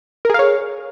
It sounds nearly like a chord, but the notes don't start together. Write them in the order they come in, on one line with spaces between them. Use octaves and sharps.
A#4 G#4 F5 C#5